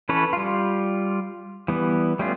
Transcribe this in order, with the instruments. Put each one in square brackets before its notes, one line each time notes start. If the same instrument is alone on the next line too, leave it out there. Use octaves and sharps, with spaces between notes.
[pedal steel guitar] E3 C#4 A4 B4 C#5
G3 F4
E3 G3 B3
G3 A3 B3 C#4 F4